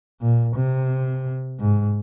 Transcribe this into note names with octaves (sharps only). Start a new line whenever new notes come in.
A#2
C3
G#2